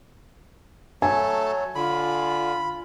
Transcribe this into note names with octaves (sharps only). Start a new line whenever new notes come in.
F#3 A3 A4 G#5 A5
D3 F4 B5